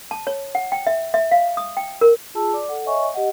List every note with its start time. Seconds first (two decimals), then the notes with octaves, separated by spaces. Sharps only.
0.11 A5
0.27 C#5
0.55 F#5
0.72 G5
0.87 E5
1.14 E5
1.31 F5
1.57 D#6
1.77 G5
2.01 A#4
2.34 F4 G#4 A5 E6
2.54 D5 D6
2.69 A4 F#5
2.86 C#5 D#5 E5 G#5 C#6
3.14 G4 D#5 F#5